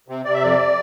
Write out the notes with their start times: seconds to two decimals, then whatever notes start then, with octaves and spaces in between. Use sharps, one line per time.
0.08 C3
0.25 C3 D5
0.34 E5
0.41 F2 D5